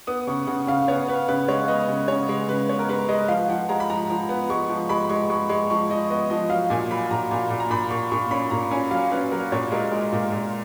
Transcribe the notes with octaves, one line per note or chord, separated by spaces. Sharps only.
B3 D#6
C#3 C#6
C#3 F#5
C#3 F5
B3 C#5
B3 B4
C#3 B4
G#3 C#5
B3 D#5
C#3
C#3 C#5
G#3
C#3 B4
B3 C#5
A#4
G#3 B4
G#3 D#5
F3 F5
F3 F#5
G#3 A#5
B5
F3 A#5
F3 A#5
B3
G#3 C#6
F3
G#3 B5
G#3 C#6
G#3 C#6
G#3 C#6
F3 C#6
F3 D#5
B3 D#5
F3 D#5
F#3 F5
A#2 G#5
F#3 B5
A#2 A#5
A#2 G#5
A#2
A#5
A#2 B5
A#2 C#6
A#2 C#6
C#4 B5
A#2 A#5
C#4 G#5
F#3 F5
C#4 B4
F#3 A#4
A#2 C#5
G#3 A#4
G#3
A#2
A#2